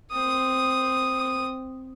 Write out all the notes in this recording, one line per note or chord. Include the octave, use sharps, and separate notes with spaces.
C4 D#6